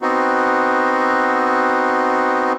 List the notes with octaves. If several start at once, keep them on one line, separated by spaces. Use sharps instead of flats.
B3 C4 D#4 F#4